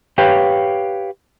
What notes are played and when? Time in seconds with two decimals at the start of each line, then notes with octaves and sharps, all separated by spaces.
0.18 G4 B4 C#5 F5 G5